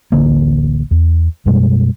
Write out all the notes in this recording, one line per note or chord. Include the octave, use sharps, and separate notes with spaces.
D1 A1 D3 A#3
E2
F#2 B2 G3 G#3